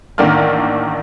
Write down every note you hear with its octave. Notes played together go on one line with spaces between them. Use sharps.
A1 D#3 A#3 D4 F6